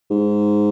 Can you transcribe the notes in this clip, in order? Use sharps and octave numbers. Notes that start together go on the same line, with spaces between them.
G#2